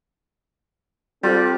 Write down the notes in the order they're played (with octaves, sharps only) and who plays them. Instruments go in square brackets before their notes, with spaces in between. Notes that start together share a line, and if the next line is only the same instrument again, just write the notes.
[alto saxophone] G3 [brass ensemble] C4 G4 A4 [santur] F4